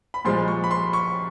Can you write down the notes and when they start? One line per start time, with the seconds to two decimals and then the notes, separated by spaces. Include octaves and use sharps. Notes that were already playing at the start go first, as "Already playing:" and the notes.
0.14 B5
0.25 A#2 F3 G#3 C6
0.48 C#6
0.64 B5
0.71 C6
0.93 C#6